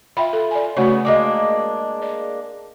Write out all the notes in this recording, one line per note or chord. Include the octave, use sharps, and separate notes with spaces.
F4 E5 G5 B5
A4
D5 G#5
C#3 A3 B3 F#4 C#5
G#3 A#3 D4
D5